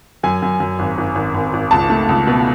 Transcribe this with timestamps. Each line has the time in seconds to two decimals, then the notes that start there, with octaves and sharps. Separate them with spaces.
0.23 F#2 G#5
0.42 F#2
0.60 F#2
0.79 G#1
0.98 G#1
1.15 G#1
1.34 G#1
1.53 G#1
1.71 C#2 A5
1.90 A3
2.09 C#2
2.27 B2